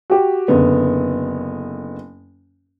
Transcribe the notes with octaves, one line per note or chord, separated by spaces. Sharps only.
F#4 G4
F#1 D3 B3